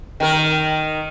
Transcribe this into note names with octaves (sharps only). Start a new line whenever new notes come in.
D#3 A#4